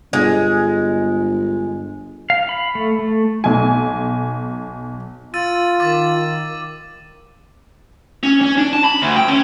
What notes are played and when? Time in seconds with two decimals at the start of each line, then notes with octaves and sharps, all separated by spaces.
0.13 G1 G#3
2.30 F5
2.49 B5
2.75 A3
2.99 A3
3.44 B1 G#5
5.34 F4 E6 A6 D#7
5.80 D#3 D6 A6
8.23 C#4
8.41 C#4
8.58 D4
8.73 A5
8.84 B5
9.02 D2
9.16 G5
9.28 C#4